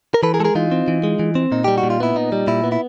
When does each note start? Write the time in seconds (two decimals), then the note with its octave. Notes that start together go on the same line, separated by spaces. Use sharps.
0.14 A#4
0.23 E3 A4 B4
0.34 G#4 A#4
0.40 G#3 A4
0.45 G#4 A#4
0.55 E3 D#4 F4
0.71 C4
0.88 E3
1.03 G#3
1.19 E3
1.35 C4
1.52 A#2 D#4
1.64 G3 G4
1.78 F#4
1.83 A#2
1.90 F4
2.00 B3 E4
2.15 A#2 D#4
2.32 G3
2.47 A#2 E4
2.64 B3
2.72 E4